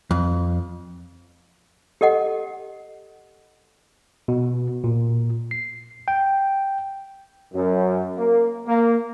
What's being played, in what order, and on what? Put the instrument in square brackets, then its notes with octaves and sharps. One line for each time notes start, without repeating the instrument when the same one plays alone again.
[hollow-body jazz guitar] F2
[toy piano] G4 A4 D#5 F#5
[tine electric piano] B2
A#2
C7
G5
[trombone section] F#2
A#3
A#3